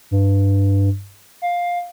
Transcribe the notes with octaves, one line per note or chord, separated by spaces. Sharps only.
G2
F5